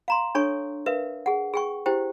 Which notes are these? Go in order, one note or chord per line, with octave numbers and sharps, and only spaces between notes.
F5 A#5 C6
D4 A4 C#5 G#5 C#6
A#4 B4 E5 F5
G#4 F#5
G#4 G5 C#6
E4 G4 C5 G5